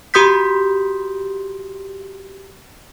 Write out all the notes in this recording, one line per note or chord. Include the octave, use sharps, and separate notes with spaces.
F#4 G4 C6 D#6 G6 B6